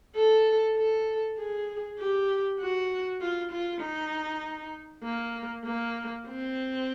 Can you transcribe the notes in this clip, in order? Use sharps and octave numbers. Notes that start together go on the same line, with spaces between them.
A4
A4
G#4
G4
F#4
F4
F4
D#4
A#3
A#3
C4